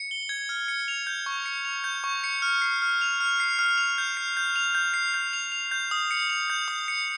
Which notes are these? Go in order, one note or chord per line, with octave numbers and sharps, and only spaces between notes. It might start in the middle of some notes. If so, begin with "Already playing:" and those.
Already playing: C#7
G7
G#6
F6
C#7
F7
G6
C#6
C#7
F7
G6
C#6
C#7
F6
C7
F6
F7
F6
C7
F6
F7
G6
C7
G6
F7
G6
C7
G6
F7
F7
G6
D#6
C#7
F7
G6
D#6
C#7